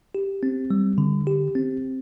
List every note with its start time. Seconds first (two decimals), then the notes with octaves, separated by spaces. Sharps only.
0.15 G4
0.43 C4
0.71 G3
0.98 D3
1.27 G4
1.55 C4